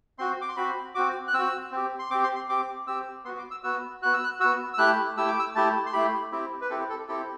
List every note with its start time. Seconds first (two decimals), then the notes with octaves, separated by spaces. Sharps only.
0.19 C4 F#4 C6
0.41 D6
0.49 C6
0.57 C4 F#4 B5
0.95 C4 F#4 D6
1.28 F#6
1.34 C4 F#4 E6
1.72 C4 G4
1.99 C6
2.10 C4 G4 D6
2.23 C6
2.35 C6
2.49 C4 G4 D6
2.87 C4 G4 E6
3.25 B3 C6
3.28 F#4
3.38 D6
3.51 E6
3.63 B3 F#4 E6
4.02 B3 F#4 F#6
4.13 E6
4.24 F#6
4.40 B3 F#4 E6
4.74 E6
4.78 A3 E4 G4 F#6
5.17 A3 E4 G4 E6
5.28 D6
5.39 E6
5.55 A3 E4 G4 A5
5.86 C6
5.93 A3 E4 G4 B5
6.32 C4 E4 G4
6.61 B4
6.70 C4 E4 G4 A4
6.89 A4
7.08 C4 E4 G4 A4